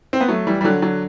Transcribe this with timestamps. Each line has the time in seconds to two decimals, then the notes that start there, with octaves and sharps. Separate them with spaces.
0.13 C4
0.21 B3
0.28 F#3 A3
0.47 E3 G3
0.61 G3
0.64 D3 F#3
0.82 D3 F#3